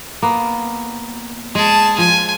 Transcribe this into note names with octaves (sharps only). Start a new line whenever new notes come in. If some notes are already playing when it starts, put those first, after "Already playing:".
A#3 B3
G#3 G#4 A5
F3 G#5